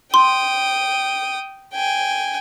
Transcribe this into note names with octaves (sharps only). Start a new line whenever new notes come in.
G5 C6 D#6
G5 G#5